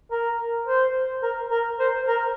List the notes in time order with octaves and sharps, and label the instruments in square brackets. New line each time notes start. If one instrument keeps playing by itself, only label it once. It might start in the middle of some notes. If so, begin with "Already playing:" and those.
[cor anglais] A#4
C5
A#4
A#4
C5
A#4